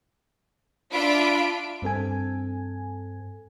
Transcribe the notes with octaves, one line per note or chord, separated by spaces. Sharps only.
D4 F4 E5 B5 D7
G2 C4 A4 G#5